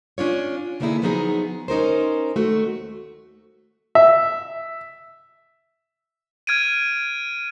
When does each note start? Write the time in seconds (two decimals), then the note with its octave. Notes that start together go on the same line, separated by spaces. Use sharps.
0.18 C#4 D4 F4 C#5
0.80 D3 A#3 B3 D#4 E4 G#4
1.02 F3 F#3 B3 D#4 G4 G#4
1.68 C#4 D#4 A#4 C5
2.36 D#2 A3 F#4
3.95 E5
6.47 F6 G#6 D7 D#7